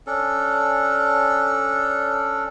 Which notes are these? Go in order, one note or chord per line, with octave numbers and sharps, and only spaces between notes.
C#4 D4 A4